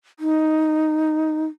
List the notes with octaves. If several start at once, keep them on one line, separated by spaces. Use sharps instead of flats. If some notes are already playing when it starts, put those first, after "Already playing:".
D#4